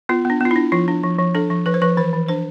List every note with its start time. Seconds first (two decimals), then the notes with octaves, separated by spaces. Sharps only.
0.09 B3 F4
0.25 B3 D4
0.41 B3 F4
0.51 E4
0.56 D4
0.72 F3 F4
0.88 D4
1.03 F3
1.19 F3
1.35 D4 A4
1.50 F3
1.66 F3 B4
1.74 C5
1.82 F3 B4
1.97 E3 C5
2.13 E3
2.28 D4 C5